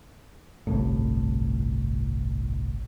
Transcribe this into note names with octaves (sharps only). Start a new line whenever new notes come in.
G1 C2 A2